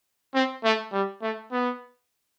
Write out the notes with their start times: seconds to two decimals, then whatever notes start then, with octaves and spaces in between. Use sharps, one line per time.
0.34 C4
0.64 A3
0.93 G3
1.22 A3
1.52 B3